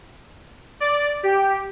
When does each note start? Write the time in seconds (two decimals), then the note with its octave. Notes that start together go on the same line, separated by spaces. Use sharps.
0.80 D5
1.23 G4